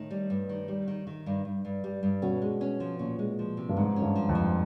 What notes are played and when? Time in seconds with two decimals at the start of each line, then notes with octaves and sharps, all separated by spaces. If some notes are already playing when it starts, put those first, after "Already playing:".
Already playing: A2 D#3
0.11 G3
0.30 G2
0.49 D#3
0.68 G3
0.88 D#3
1.07 D#3
1.26 G2
1.45 G2
1.65 G2
1.84 G3
2.03 G2
2.22 B2 C#4
2.42 G#3
2.61 C#4
2.80 F3
2.99 A#2 C#4
3.19 G#3
3.39 F3
3.57 C3
3.69 G2
3.77 G#2 F3
3.96 C#4
4.02 G2
4.16 F3
4.29 F2
4.35 F3